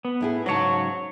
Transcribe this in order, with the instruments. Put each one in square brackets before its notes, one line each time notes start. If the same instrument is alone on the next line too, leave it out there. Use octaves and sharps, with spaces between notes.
[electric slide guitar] B3
[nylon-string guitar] A2 E4 G#4
[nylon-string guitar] G#2 C#3 A5 [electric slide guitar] F#3 C#5